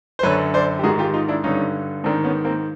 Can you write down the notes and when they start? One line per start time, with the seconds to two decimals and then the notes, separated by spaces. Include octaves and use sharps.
0.19 C5
0.23 F#2 D3 B4 C#5
0.54 C5 D5
0.79 G4
0.83 G#2 D#3 F#4 G#4
0.99 F4 G4
1.14 D#4 F4
1.28 D4 E4
1.44 G2 D3 C#4 D#4
2.04 G#2 D#3 C4 D4
2.24 B3 C#4
2.44 A#3 C4